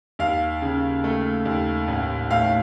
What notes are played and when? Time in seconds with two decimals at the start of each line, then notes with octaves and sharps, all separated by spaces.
0.19 D#2 F5
0.62 C#3
1.04 A3
1.45 D#2
1.88 A1
2.30 A2 F5